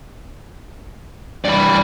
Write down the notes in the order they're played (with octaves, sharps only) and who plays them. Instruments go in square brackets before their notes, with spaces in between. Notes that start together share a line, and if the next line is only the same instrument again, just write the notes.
[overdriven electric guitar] G2 E3 [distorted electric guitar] D5 B5